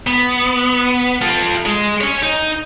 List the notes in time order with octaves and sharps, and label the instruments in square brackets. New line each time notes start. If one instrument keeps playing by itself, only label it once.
[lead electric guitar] B3
F4 A4
G#3
C#4 C#5
D#4